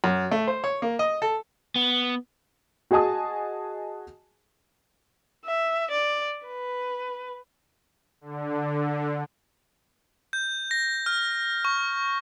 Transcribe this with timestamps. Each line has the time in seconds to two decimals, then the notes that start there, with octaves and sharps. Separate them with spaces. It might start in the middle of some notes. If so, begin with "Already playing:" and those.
0.04 F#2
0.31 A3
0.47 C5
0.64 C#5
0.82 A#3
0.99 D#5
1.22 A4
1.76 B3
2.91 F#4 G#4 D#5 G#5 A5 D#6
5.45 E5
5.91 D5
6.47 B4
8.21 D3
10.33 G6
10.71 A#6
11.06 F6
11.65 C#6